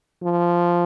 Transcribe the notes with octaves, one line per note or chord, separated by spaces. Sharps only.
F3